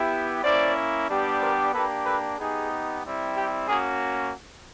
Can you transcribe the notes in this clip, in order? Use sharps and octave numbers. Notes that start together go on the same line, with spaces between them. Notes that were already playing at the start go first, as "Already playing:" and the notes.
Already playing: B3 E4 G4
A#3 C#4 E4 C5 D5
G3 B3 D4 G4
A#4 C5
A#3 D4 G4 A4 B4
A4 B4
B3 D#4 G4 G#4
G3 C4 E4
G4
A#3 C#4 F#4 G#4